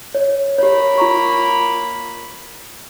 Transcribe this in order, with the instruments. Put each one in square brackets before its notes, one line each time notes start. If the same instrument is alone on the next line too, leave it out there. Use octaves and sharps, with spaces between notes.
[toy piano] C#5
[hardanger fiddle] A#3 B5 [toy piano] G4 C#5
[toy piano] F4 A#5 C#6